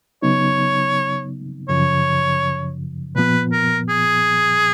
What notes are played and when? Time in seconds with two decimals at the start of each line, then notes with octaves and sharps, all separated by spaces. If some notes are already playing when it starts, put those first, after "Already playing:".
0.22 C#3 F#3 B3 D#4 C#5
1.69 F#2 C#3 F3 C#5
3.16 A#2 F3 B3 B4
3.52 A#4
3.89 G#4